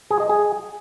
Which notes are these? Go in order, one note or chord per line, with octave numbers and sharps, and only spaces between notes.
G#4
D#5
G#4